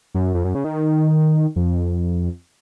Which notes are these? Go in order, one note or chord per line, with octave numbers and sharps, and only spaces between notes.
F#2
F2
F#2
C#3
D#3
F2